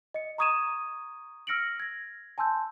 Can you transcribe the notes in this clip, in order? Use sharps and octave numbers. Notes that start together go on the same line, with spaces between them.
D#5 C#7
A#5 C#6 D#6 G#6 D#7 E7
E6 F6 A#6 C#7 D7 F#7
G#6 A#6
G#5 A5 C6 E6 G6